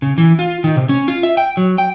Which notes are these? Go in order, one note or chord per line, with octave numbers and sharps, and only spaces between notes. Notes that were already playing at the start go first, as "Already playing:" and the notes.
C#3
E3
F4
D#3
C3
C#4
F4
E5
G5
F#3
G5